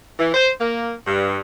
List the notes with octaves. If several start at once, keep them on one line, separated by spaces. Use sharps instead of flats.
E3
C5
A#3
G2